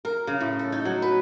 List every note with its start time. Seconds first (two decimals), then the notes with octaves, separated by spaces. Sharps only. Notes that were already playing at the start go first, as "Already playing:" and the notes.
0.05 A#4
0.27 C#3
0.41 A2
0.59 A4
0.72 D#4
0.85 F#3
1.02 B4